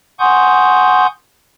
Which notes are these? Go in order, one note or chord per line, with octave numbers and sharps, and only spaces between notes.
F#5 G#5 C6 C#6 D#6 G6